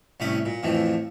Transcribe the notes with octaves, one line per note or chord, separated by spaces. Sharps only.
C2 A2 C#4 B5 D#6
A#2
F2 A2 E3 F3